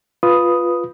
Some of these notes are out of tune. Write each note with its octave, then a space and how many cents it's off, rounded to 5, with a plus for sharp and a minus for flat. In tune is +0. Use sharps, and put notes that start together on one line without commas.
F4 +0 B4 +0 D#6 +0